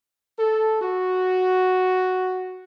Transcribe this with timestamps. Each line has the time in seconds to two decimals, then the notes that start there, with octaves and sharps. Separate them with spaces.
0.39 A4
0.81 F#4